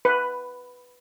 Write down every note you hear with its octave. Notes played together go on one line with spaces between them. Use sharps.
B4